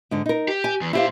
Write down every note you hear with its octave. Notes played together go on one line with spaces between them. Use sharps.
G#2 D3
D#4 A#4
G4
G#5
E2
A#2 E4 G4 C5 F5